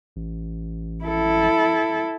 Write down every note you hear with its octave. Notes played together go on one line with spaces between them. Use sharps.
A1
E4 A4